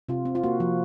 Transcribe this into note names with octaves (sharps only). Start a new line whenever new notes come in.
C3 F4
C4
F4
A#3 F#4
F3